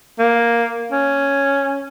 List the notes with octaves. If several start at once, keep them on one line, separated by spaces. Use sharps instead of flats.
A#3
C#4